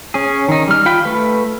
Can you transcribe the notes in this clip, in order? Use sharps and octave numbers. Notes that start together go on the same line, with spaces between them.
C#4 G#4
D#3 D#4
G3 F6
F4 G5 B5
A3 B4